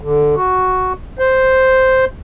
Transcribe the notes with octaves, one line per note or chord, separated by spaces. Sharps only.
D3
F#4
C5